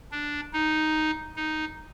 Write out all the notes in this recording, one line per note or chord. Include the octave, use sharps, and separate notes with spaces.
D4
D#4
D#4